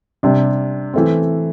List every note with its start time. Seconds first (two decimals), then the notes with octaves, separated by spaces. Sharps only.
0.23 C3 G3 D4
0.94 E3 A3 C4